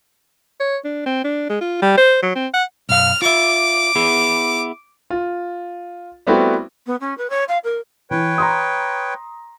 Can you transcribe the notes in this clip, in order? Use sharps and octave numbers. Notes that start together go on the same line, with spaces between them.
C#5
D4
C4
D4
G#3
F4
G3
C5
F#3
C4
F#5
B1 F#2 F5 F6
F4 E5 D6
B3 E4 G#4
F4
G3 A3 B3 C4 E4 F#4
B3
C#4
B4
C#5
F5
A#4
E3 B4 C#5 G5
A#5 C6 D#6